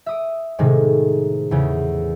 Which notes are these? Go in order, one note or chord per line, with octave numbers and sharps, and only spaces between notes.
E5 D#6 D7
A2 C3 D#3 G#3
E2 C#3